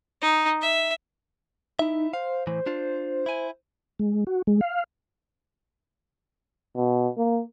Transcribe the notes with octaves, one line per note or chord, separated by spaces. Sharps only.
D#4
E5
D#4 E4 E5
C5 F5
A2 E3 C5
D4 F4
E4 G#5
G#3
F#4
G#3
F5
B2
A#3